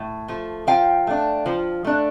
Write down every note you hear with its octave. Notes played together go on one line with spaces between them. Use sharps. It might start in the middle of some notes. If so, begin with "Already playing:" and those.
Already playing: A2
F3 A3
F3 F5 G5
A3 D4
F3
A3 D4